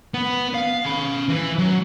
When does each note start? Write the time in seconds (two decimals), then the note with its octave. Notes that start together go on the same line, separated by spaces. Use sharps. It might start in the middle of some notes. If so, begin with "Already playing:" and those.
0.14 B3
0.55 F5
0.85 C#4 B5
1.28 E3 B4
1.58 F#3